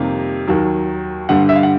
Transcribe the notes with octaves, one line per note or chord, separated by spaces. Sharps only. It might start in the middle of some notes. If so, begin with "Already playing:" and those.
Already playing: F2 C3 D#3 G3 A#3
D#2 D#3 F#3
G2 D3 G3 F#5
E5
F5
F#5